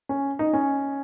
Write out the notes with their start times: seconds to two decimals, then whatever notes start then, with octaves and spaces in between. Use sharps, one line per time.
0.09 C#4
0.39 D#4
0.54 C#4